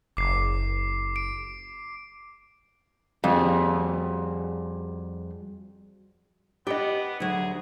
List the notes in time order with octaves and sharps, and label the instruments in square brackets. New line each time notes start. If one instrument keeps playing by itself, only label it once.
[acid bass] F#1 [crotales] D6 C7
[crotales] D7
[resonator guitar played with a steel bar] F2 [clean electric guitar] G3 F#4 G#4
[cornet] B3 [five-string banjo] G4 D#5 [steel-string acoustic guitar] G5
[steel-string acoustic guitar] D2 F#3 [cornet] G#4